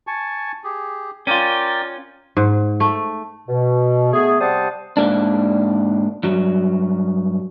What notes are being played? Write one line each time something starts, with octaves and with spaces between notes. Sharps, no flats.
G#5 A5 C#6
G4 G#4
C#4 F4 A#4 D5 G5
G#2
A3
B2
A3 B3 G#4
C3 G3 C5 F#5 A5 D#6
G#2 A#3 D4
G2 F#3